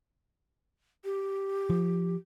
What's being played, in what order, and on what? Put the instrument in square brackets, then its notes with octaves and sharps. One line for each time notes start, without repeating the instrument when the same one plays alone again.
[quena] G4
[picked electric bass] F3